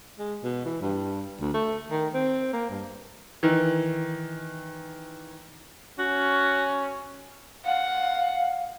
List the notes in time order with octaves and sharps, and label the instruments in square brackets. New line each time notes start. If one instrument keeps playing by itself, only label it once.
[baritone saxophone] G#3
B2
E3
G2
D2
A3
D#3
C4
A#3
G2
[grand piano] D#3 E3
[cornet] C#4 [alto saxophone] F#4
[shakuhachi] F5 [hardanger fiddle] F#5